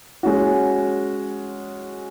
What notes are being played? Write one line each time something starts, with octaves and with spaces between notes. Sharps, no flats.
G#3 C#4 F#4